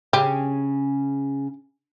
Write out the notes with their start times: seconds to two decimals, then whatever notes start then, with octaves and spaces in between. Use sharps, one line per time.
0.13 C#3 C#4 G4 G#4